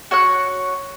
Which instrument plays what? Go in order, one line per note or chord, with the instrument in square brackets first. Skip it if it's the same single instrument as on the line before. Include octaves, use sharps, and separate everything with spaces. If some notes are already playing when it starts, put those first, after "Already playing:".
[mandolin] F#4 C#5 F#5 F#6